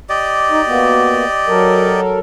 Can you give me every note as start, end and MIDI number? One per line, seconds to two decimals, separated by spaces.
0.10 2.01 67
0.10 2.01 74
0.10 2.01 75
0.51 0.61 63
0.68 1.25 58
0.68 1.25 59
0.68 1.25 66
1.48 2.19 54
1.48 2.19 69
1.48 2.19 70